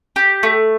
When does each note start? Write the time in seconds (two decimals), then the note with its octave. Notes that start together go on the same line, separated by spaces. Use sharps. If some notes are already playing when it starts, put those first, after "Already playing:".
0.16 G4
0.43 A3